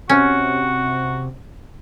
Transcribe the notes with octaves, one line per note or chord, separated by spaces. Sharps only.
C3 C#4 F#4